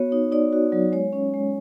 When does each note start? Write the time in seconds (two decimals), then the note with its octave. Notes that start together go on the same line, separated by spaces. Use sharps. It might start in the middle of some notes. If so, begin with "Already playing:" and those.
Already playing: B3 F#4 C#5
0.12 D#4
0.32 D#4 D5
0.53 F#4
0.72 F#3
0.92 G#3 C#5
1.13 C#4
1.34 G#3